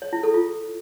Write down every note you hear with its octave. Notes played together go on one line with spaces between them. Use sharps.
C#5
E4
A4
F4